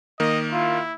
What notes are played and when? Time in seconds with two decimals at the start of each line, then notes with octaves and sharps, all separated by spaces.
0.20 D#3 A#3 D#5
0.52 E4 F4